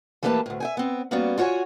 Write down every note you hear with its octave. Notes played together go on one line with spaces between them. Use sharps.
E3 A3 A#3 G4 B4 A5
D2 A2
E5 G5 G#5
B3 C4
G3 A#3 B3 C#4 F#4 D5
F4 F#4 C#5 F#5 G#5